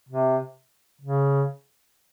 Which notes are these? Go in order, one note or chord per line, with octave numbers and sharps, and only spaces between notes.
C3
C#3